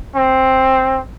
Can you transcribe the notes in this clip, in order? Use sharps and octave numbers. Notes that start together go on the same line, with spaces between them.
C4